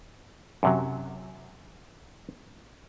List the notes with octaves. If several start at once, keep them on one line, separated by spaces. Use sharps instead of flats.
F#2 C3 F#3